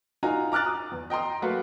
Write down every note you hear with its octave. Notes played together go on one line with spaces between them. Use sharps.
D#4 F4 F#4 G#5 A#5
A#5 D6 F6 F#6 A6
D#6
E2
D#5 G5 A#5 C6 D#6
F#3 A3 A#3 F#4 B4 F5